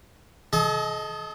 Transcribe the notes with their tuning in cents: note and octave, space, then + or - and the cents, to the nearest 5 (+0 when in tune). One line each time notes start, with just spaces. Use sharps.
A4 -45 D#5 +10 A5 +0